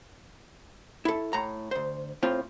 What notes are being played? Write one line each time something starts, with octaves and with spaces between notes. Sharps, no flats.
E4 A4
A2 A#5
D2 C5
A2 C4 F4